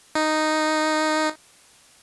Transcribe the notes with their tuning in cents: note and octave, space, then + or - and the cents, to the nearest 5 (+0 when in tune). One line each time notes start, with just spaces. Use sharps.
D#4 -5